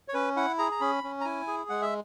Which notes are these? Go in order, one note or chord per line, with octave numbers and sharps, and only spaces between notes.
C#5
C#4 B4
E4 F#5
G#4 A#5
A#5
C#4 B5
C#4
A#5
E4 G#5
G#4
G#3 F#5
E5